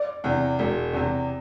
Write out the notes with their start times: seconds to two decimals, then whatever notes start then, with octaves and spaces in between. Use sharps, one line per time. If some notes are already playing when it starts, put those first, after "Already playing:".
Already playing: D5
0.24 E2 C3
0.59 E1
0.93 E2 C3